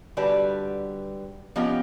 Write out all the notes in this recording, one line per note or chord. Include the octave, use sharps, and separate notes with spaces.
D3 G3 F#4 B4 D5 A5
F3 B3 C#4 G4 D#5 G5